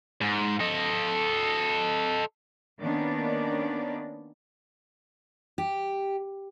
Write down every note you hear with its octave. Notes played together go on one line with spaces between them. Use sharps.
G#2
A4 D#5
D#3 A#3 B3 C#4 D4 D5
G4